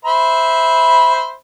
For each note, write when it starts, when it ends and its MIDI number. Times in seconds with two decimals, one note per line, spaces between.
0.05 1.32 72
0.05 1.32 76
0.05 1.32 83